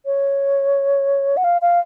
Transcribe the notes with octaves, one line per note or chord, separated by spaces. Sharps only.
C#5
F#5
F5
F5